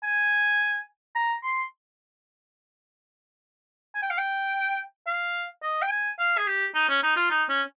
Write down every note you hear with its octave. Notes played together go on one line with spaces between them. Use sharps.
G#5
A#5
C6
G#5
G5
F5
G5
F5
D#5
G5
G#5
F5
G#4
G4
D#4
C#4
D#4
F4
D#4
C#4